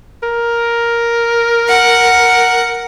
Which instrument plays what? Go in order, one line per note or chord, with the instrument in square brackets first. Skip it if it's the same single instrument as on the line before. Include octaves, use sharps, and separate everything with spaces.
[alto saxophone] A#4
[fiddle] F#5